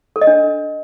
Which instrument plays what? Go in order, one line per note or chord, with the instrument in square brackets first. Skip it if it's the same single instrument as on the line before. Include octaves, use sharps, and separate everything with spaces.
[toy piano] A4
D#5
D4